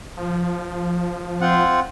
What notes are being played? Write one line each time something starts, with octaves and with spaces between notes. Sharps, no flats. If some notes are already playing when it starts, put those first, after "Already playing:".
F3
C4 F4 F#5